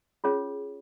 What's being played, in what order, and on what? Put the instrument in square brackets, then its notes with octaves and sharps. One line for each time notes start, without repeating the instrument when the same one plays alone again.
[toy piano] C#4 F4 G#4 C#5